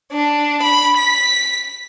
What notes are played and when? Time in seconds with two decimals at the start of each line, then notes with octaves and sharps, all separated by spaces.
0.13 D4
0.62 B5
0.97 B6